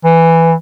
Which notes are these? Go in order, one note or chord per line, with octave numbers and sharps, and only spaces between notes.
E3